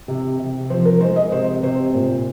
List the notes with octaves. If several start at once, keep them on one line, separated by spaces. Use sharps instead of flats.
C3
C3
F3 C5
A#4
G#3 C5
D#5
C3 C5
C3 C5
A#2